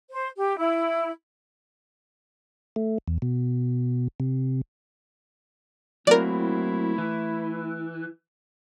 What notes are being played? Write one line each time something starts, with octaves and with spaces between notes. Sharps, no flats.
C5
G4
E4
A3
E2
B2
C3
F#3 A3 A#3 C4 E4 A#4 D5
E3